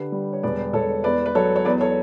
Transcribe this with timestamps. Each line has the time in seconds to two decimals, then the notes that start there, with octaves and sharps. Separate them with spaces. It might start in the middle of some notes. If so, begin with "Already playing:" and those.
Already playing: D3 G4 B4
0.12 G3
0.33 C#5
0.43 E1 B4 D5
0.73 E1 A4 C#5
1.04 E2 B4 D5
1.26 B4
1.35 F#3 A4 C#5
1.56 C#5
1.65 E2 B4 D5
1.81 A4 C#5